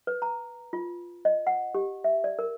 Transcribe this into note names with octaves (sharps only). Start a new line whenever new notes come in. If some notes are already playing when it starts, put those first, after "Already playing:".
B4
A#5
F4
D#5
F#5
G4
E5
D5
A#4